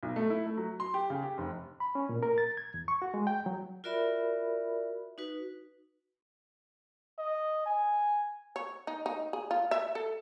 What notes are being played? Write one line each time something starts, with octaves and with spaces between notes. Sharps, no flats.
B1
A3
E4
A3
F#3
C6
G4
C#3
G4
F1
B5
C#4
A#2
A#4
A6
G#6
E2
C#6
F#4
G#3
G5
F#3
F4 F#4 A#4 D5 E5 B5
D#4 F#4 B4
D#5
G#5
C#5
D#4
D#4
G#4
F4
E5
A4